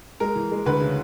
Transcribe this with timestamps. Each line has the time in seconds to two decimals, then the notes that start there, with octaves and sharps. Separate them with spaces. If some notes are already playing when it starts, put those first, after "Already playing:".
0.20 G#3 A#4
0.36 E3
0.51 G#3
0.66 D2 B4
0.81 C#3